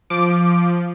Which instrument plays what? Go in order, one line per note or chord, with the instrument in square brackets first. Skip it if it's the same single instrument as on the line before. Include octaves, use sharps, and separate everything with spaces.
[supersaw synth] F3 [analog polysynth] D6